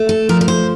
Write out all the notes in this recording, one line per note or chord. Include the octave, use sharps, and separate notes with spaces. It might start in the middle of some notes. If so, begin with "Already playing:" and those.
Already playing: A3
A4
F3 A#4
A#4
C5